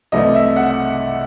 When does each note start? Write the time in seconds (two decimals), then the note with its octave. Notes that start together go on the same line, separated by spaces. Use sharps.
0.12 C2 C3 E3 A3 D4 D#5
0.35 E5
0.56 F#5